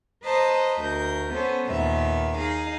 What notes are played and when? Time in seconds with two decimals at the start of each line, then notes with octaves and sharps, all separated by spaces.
0.24 B4 C5 D#5 A5 A#5
0.81 D2 A#4 G6
1.33 B3 C#4 A4 C5
1.67 D#2 A#2 B3 E5
2.37 D#4 G#4 F5